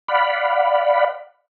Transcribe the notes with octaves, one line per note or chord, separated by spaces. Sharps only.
D5 F5 F#5 B5